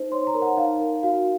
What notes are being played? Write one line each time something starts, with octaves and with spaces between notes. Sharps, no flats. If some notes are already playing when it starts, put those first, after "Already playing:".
Already playing: D#4 C5
C#5 C6
A#5
A#4
F#5
D#4 F5
A#4
F#4 F5